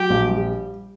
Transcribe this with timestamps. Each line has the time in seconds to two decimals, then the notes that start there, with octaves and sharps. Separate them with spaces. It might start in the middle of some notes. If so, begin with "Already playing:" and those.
Already playing: F#3 G4
0.10 A#1
0.30 G3